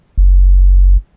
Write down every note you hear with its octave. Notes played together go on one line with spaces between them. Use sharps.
F#1